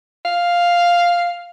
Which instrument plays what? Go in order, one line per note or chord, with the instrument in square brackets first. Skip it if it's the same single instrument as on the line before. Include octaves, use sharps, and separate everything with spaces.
[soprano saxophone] F5